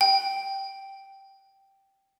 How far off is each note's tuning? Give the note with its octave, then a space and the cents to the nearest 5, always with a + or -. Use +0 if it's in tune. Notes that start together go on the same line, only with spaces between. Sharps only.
G5 -5